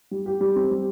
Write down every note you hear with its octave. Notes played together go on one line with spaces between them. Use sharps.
G3
G4
G3
C4
G3